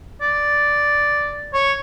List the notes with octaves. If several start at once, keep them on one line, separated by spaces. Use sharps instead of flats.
D5
C#5